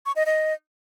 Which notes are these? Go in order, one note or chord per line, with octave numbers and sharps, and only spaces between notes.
C#6
D#5
D#5